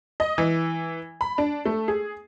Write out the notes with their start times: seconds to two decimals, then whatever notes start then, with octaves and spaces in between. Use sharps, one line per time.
0.20 D#5
0.38 E3
1.21 B5
1.38 D4
1.65 A3
1.88 G#4